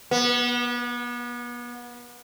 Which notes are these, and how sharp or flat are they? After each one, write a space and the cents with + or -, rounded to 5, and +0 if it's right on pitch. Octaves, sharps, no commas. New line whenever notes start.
B3 -35